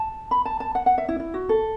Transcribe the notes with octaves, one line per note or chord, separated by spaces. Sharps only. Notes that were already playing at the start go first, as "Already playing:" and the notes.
Already playing: A5
B5
A5
A5
F#5
F#5
E5
E4
E4
F#4
A4